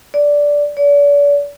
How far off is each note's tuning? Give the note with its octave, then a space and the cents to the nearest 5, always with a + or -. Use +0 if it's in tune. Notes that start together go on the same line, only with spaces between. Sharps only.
D5 -10
D5 -40